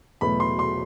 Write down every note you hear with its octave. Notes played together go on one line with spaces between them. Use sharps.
E2 B2 F#3 A3 B5
C6
C6